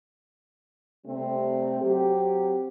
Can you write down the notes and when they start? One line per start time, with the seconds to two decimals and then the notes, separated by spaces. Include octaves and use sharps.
1.06 C3 G3 A3 C4
1.80 F#3 C4 G4